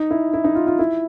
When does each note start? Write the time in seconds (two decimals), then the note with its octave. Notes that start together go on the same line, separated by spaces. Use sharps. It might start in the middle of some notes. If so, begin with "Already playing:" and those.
Already playing: D#4
0.11 E4
0.33 E4
0.44 D#4
0.55 F4
0.67 F4
0.79 E4